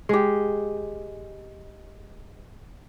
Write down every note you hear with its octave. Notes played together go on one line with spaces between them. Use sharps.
G#3 G4